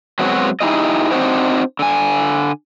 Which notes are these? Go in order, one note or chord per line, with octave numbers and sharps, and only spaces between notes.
F#3 G#3 B3 C4 F#4
D#4 E4 G4 G#4 D#5
C4 D4 D#4 F#4 C5 C#5
D3 G#5